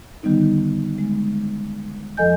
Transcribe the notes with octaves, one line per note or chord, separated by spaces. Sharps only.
D3 D#3 G3 B3 D#4
G#3
F2 F3 A4 D#5 G#5 G6